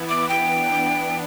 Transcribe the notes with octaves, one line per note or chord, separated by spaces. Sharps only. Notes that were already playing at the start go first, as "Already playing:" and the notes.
Already playing: E3 B3 E4
D6
E3 B3 D4 G5